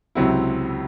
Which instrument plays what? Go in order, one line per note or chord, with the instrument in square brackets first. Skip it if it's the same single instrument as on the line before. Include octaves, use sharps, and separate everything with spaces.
[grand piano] C#2 C3 F#3 C4 E4